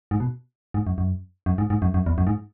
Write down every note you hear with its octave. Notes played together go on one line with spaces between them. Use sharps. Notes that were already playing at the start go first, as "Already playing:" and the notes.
G#2
B2
G#2
F#2
F#2
F#2
G#2
G#2
F#2
F#2
E2
F#2
G#2